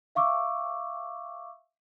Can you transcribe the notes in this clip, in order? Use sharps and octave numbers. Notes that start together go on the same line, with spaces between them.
E5 F5 C#6 D6 E6